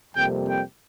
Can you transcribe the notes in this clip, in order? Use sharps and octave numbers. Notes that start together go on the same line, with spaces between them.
F2 C3 G3 A#3 G5
G5